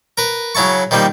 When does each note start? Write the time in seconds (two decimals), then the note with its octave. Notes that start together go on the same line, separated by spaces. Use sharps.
0.18 A#4 B4
0.55 C#3 F#3 E4 A5 C#6
0.91 D#3 F3 G3 A#3